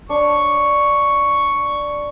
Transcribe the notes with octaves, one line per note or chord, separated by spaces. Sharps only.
D4 C#6